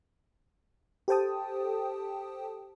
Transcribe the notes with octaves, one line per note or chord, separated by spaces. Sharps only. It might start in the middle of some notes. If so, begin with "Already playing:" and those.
G4 A4 C5 G5 A5 D#6